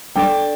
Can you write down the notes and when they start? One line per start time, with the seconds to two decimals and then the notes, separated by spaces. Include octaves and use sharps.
0.16 G3 D4 A4 D5 G5